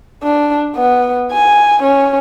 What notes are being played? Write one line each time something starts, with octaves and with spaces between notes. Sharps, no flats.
D4
B3
G#5
C#4